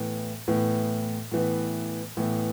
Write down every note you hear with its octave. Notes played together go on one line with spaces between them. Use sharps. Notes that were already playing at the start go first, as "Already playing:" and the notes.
Already playing: A2 E3 B3
A2 E3 B3
A2 E3 B3
A2 E3 B3